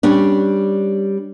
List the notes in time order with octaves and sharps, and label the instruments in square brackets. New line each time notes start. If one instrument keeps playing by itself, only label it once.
[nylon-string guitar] G3 C#4 D4